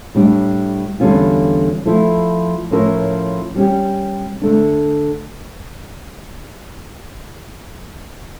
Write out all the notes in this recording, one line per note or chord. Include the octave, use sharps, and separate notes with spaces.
A2 G3 D4
E2 D3 G3 C#4 F4
F3 A3 E4
A2 F3 C#4 E4 A#4
G3 C#4 G4
D3 A3 D4